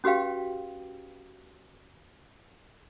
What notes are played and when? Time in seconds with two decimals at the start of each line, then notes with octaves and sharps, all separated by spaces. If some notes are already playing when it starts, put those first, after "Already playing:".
0.04 C#4 F#4 G4 B4 F5 G5